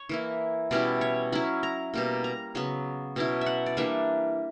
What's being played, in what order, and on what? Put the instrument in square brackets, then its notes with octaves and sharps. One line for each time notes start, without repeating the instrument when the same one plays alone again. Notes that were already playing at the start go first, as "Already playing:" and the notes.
Already playing: [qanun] C#5
E3 A#3 E4
B2 G3 C#4 E4 D5
C#5
F#3 C#4 E4 B5
A#5
B2 G3 A#3
A#5
C#3 F#3 B3
B2 F#3 C#4 E4
E5
F#5
D5
E3 G3 A#3 D4 E5